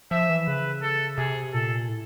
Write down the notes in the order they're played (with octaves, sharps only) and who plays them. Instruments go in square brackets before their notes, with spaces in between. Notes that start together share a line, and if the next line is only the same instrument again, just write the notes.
[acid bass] F3 [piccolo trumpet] E5
[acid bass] E3
[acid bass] C#3 [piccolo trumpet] B4
[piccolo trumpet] A4
[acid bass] C3 [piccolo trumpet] G#4
[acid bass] A#2 [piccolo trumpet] A4
[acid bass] A2